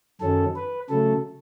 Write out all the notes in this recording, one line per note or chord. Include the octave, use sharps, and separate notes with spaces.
F#2 D#3 F#3 C#4 A4
B4
C#3 F#3 A3 A4